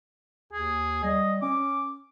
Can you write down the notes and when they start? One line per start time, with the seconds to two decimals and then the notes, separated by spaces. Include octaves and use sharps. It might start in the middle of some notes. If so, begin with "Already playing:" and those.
0.53 D#2 G#4
1.04 G3 D#5
1.42 C#4 D6